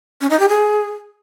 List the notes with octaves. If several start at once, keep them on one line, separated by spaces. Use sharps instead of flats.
C#4
D#4
G4
G#4